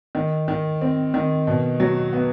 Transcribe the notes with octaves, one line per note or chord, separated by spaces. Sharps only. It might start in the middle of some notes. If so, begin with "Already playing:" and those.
D#3
D#3
C4
D#3
B2
F#3
B3